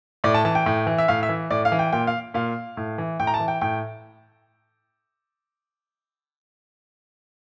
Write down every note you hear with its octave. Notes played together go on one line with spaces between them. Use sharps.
A2 D5
A5
E3 A5
G5
A2
E3
E5
A2 F5
E5
E3
A2 D5
F5
E3
G5
A#2 G5
F5
A#2 F5
A2
E3
A2 G5
A#5
A5
E3
G5
A2 G5